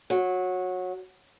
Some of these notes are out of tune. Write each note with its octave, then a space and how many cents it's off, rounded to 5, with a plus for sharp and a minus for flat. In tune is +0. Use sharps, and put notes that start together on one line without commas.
F#3 -20